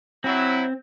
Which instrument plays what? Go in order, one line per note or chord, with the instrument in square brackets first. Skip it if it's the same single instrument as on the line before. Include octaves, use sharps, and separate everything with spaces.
[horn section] F#3 E4 [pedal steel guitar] C4